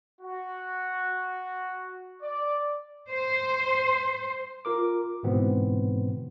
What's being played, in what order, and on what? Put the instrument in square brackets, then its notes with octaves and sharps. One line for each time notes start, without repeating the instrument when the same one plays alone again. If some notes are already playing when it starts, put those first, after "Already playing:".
[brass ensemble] F#4
D5
[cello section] C5
[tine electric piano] F4 A#4 D6
G#2 B2 D3 E3 B3 C4